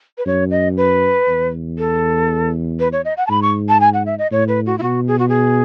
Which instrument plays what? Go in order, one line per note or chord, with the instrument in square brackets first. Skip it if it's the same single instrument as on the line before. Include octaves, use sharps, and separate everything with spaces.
[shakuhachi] B4
[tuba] F#2 [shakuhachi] C#5
[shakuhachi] D#5
B4
[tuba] E2
[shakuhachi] A4
B4
C#5
D#5
F#5
A5
[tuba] G#2 [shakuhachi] B5
[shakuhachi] C#6
A5
G#5
F#5
E5
D#5
[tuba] A2 [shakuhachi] C#5
[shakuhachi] B4
F#4
E4
[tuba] B2 [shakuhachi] F#4
[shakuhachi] G#4
F#4
G#4